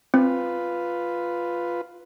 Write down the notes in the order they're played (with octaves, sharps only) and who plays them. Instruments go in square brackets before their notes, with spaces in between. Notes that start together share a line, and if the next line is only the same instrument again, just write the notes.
[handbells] C4 [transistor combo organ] F4 B4